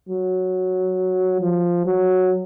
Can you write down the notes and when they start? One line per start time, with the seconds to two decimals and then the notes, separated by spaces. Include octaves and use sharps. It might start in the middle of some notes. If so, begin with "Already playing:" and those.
0.09 F#3
1.41 F3
1.86 F#3